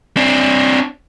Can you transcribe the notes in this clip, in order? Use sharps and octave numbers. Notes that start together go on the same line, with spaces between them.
C4 D4